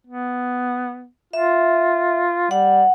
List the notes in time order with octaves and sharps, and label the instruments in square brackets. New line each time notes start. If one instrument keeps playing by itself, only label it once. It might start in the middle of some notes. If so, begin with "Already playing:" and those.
[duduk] B3
[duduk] F4 [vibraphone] E5
[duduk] G3 [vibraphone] F#5